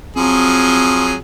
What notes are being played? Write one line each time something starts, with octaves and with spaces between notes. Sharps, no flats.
F3 F#3 C4 G#4